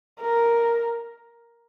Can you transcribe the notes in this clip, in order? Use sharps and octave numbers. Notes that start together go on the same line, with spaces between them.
A#4